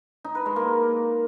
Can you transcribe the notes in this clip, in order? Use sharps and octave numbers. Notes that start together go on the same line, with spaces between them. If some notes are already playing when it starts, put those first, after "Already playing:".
D#4
B4
G#3
A#3